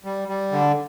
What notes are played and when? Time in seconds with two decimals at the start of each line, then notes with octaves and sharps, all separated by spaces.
0.05 G3
0.28 G3
0.52 D3